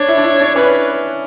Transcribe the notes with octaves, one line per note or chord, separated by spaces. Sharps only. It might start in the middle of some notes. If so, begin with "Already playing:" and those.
Already playing: D4 C#5
E4
D4
E4
D4
C#4 B4